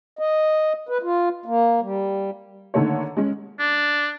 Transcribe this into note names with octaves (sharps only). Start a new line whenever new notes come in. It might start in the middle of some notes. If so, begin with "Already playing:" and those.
D#5
B4
F4
A#3
G3
D3 D#3 A3 A#3 C#5
G#3 C#4
D4